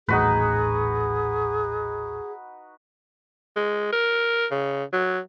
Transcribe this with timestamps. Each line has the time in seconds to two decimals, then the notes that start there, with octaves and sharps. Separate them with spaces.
0.08 D#1 A1 A2 D#4 F#4 G#4 B4
3.56 G#3
3.93 A#4
4.51 C#3
4.93 F#3